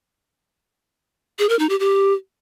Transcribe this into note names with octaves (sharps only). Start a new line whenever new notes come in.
G#4
A#4
D#4
G4
G4